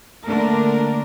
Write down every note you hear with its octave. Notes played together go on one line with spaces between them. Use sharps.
D3 A3 A#3 D4 A#4